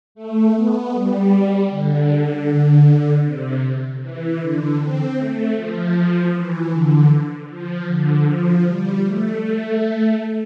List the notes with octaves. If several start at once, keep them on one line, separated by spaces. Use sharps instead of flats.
A3
B3
G3
D3
C3
E3
D3
C4
A3
F3
E3
D3
F3
D3
F3
G3
A3
A3